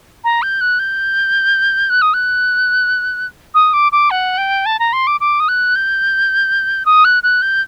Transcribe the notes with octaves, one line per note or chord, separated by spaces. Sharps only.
A#5
G6
F#6
G6
F#6
D#6
F#6
D#6
D6
D6
F#5
G5
A5
A#5
C6
D6
D6
D#6
F#6
G6
D#6
F#6
F#6
G6